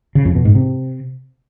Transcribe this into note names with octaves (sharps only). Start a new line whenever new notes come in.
C#3
F2
B2
G#2
C3